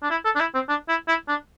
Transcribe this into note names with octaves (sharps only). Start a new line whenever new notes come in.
D4
E4
A4
D4
E4
C4
D4
E4
E4
D4